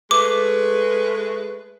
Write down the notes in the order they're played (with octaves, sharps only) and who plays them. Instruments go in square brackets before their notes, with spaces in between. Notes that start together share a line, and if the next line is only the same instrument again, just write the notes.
[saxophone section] G#3 A3 B4 [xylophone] D6